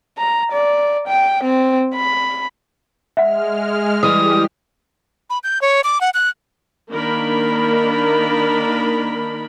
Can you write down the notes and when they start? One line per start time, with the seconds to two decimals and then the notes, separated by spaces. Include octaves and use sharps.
0.18 A#5
0.52 D5
1.08 G5
1.44 C4
1.96 B5
3.17 G#3 E5 F#5 F6
4.03 E3 G3 G4 D#6
5.30 B5
5.44 G6
5.62 C#5
5.84 D6
6.01 F#5
6.14 F#6
6.91 D#3 A#3 D4 A#4 B5